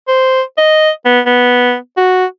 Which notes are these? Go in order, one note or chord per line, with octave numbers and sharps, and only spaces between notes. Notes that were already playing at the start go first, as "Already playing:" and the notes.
C5
D#5
B3
B3
F#4